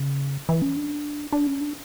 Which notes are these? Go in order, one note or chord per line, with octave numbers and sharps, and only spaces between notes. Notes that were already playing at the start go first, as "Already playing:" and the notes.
Already playing: C#3
E3
C#4
D4
D4
C#4
D4